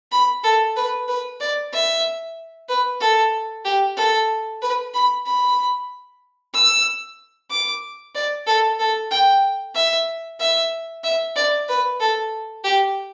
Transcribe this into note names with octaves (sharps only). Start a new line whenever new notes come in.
B5
A4
B4
B4
D5
E5
B4
A4
G4
A4
B4
B5
B5
E6
D6
D5
A4
A4
G5
E5
E5
E5
D5
B4
A4
G4